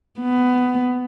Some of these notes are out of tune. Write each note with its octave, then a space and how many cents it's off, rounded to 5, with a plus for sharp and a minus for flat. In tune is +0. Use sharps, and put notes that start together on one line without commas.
B3 +15